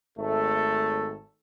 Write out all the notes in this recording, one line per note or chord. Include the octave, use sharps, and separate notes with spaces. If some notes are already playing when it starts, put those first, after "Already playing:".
G#1 A3 A4